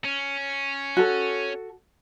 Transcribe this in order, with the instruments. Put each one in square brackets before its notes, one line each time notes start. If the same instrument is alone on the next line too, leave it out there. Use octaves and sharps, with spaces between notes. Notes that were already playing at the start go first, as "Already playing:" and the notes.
[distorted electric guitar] C#4
[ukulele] F#4 A4